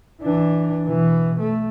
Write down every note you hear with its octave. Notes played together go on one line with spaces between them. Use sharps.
E3 D4
B2 E3
A3